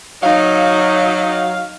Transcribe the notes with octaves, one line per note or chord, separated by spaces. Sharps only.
F#3 D#4 F5